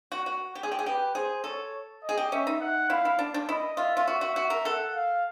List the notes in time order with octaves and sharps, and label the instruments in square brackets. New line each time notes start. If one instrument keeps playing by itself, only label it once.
[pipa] F#4
F#4
G4
G#4
G4
G#4
[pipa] G4 [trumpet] B4
[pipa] G#4 [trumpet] C5
[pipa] A4 [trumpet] C#5
[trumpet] D#5
[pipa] G#4
G4
[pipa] C#4 [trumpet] E5
[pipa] D#4
[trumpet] F#5
[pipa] E4 [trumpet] F5
[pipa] E4
D4
D4
[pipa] E4 [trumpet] D#5
[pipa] F4 [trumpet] E5
[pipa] F4
F#4
F#4
F#4
A#4
[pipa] A4 [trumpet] F#5
[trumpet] F5